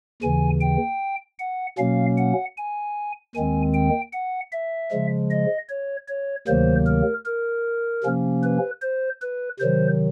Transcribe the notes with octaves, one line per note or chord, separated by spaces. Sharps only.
D#2 C#3 E3 G#5
G5
F#5
B2 F#3 A#3 C#4 F5
F#5
G#5
D#2 D#3 G#3 C4 G#5
G5
F#5
E5
C#3 F3 G#3
D#5
C#5
C#5
D2 C3 D#3 F#3 A#3 C5
A#4
A#4
C3 F3 A#3 C#4
B4
C5
B4
C3 D#3 F#3 C5